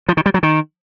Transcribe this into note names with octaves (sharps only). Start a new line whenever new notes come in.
F3
D#3
G3
F#3
D#3